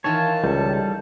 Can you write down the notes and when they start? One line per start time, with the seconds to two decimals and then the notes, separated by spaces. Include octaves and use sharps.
0.04 D#3 E3 F4 C#5 A5
0.44 C#2 G3 A4